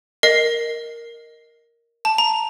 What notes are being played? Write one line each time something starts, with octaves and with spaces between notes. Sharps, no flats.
A#4 D#5 C7
A5
A#5